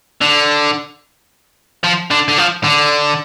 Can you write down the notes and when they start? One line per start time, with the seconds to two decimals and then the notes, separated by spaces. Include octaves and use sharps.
0.22 D3
1.84 F3
2.11 D3
2.28 D3
2.38 F3
2.64 D3